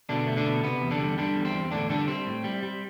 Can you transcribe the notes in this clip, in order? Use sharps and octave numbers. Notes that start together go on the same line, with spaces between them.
B2 D3 D4
A3
D3 D4
B2
C3 B3
E2
D3 D4
G3
D3 G3 D4
E2
C4
E2
A2 D3 D4
D3 G3 D4
G3 C4
A2
G3
G3